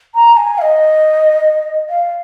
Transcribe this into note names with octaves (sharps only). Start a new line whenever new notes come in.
A#5
G#5
F5
D#5
F5